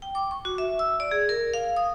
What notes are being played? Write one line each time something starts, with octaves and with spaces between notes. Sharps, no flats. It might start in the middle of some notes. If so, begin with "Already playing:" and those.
G5
D6
C#6
F#4
E5
E6
D5
G#4
A#4
F5
D#6